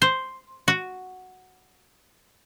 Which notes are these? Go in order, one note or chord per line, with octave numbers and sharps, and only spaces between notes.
C5
F#4